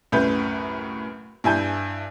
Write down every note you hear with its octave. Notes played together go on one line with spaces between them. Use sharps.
C2 F#2 A2 C#4 B4 G6
G2 E4 G#5 A5 G6